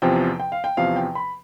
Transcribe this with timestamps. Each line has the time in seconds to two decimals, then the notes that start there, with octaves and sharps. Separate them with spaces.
0.02 E2 C3 F3 G5
0.40 G5
0.52 F5
0.64 G5
0.77 E2 C3 F3 F5
0.96 G5
1.15 B5